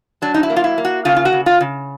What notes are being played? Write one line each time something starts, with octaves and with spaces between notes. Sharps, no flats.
F#3 D4
D#4
E4
A#3
F4
E4
A#3
F#4
C#3 F4
F4
F#4
C#3
F4
C#3